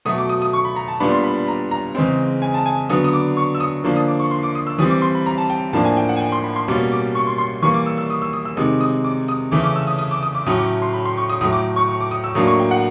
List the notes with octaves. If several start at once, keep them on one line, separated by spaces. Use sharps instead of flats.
B2 F#3 A3 D#6
D6
D#6
D#6
C#6
B5
A#5
A5
A#2 G3 B3 D4 B5
C6
B5
B5
A#5
A#5
C#3 E3 G#3 C4
G#5
A5
G#5
D3 F#3 B3 D#6
D#6
D6
C#6
E6
D#6
D3 F3 A#3 D4
D#6
D6
C#6
C6
D6
D#6
E6
E3 G3 C4 D#6
D6
C6
B5
A#5
A5
G5
A2 F3 A#3 D4 A5
G#5
G5
F#5
G#5
G5
C6
B5
C6
B2 G3 A#3 C#4 D6
D6
C#6
C6
C6
E3 G3 A#3 C#6
D6
E6
E6
D#6
E6
D#6
E6
C3 D#3 G#3 D#6
D#6
D6
D#6
C#3 E3 A3 C#4 D6
D6
E6
D#6
D#6
D6
D#6
D6
A2 F#3 A3 C#4 D#6
D6
C6
B5
C6
C#6
D#6
A2 F#3 A3 D#6
D6
C#6
C#6
D6
D#6
E6
A2 F#3 A#3 D4 D#6
C#6
G5
F#5